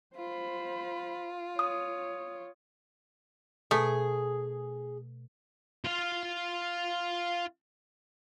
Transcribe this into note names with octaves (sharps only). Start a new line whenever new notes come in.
F4 C5 B5
C#5 D#6
B2 A3 G#4
F4 F5